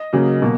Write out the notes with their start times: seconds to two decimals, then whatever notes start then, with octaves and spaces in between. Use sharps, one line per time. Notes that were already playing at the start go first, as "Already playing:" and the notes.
Already playing: D#5
0.13 C#3 F#3 A#3
0.42 B2 F#3 A#3